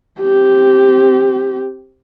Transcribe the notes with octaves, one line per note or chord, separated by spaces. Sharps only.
C4 G4